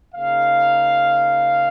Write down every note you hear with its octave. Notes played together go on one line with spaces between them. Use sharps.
C#3 A#3 D#4 F5